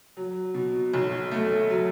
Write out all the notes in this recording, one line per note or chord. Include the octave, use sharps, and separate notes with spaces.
F#3
B2
B1
A3
F#3